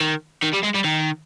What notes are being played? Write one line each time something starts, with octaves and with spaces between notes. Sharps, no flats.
D#3
D#3
G3
G#3
G3
D#3